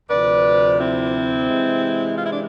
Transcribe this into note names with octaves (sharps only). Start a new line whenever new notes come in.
D2 C3 F3 B4 D5
C4 E4
C3 E3 G#3
F4
E4
D4